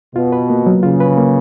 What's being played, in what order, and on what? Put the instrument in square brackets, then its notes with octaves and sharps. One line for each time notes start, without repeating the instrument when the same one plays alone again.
[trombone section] B2 [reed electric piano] F4
[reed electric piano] B4
A#3
F#3
[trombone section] C#3 [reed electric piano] F4
[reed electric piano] B4
A#3